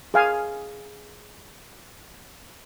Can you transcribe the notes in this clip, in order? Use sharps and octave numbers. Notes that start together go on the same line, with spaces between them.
G#4 F5 G#5